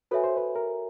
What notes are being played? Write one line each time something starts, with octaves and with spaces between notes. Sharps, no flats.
F#4 A4 B4 C#5 E5 G#5
C5
B4
A#4